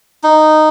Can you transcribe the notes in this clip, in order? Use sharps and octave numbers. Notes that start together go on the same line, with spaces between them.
D#4